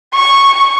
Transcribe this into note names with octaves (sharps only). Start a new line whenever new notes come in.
C#6